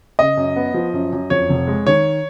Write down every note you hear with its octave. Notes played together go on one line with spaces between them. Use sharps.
C#3 D#5
F#2
B3
F3
F#2
F#2
F2 C#5
F1
G#3
D#3 C#5